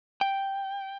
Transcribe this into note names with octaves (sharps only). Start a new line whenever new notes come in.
G5